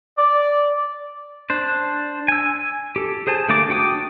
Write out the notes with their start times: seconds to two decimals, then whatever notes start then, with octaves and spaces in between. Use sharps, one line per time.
0.18 D5
1.50 D4 C5
2.28 G#5 E6
2.96 G4 A4
3.27 G#4 C5 G#5 A5
3.49 D3 A3 A#3 D5 D6
3.69 D4 F#4 G5 D6 D#6